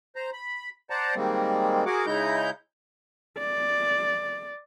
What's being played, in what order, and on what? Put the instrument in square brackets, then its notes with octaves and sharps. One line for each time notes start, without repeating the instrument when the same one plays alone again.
[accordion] C5 A#5
B5
C5 D5 F#5 A5 A#5
D#3 G3 G#3 A#3 C4
F#4 G#4 A#4 F#5 D6
C#3 G#3 D#4 E4 A#5 G6
[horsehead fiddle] D5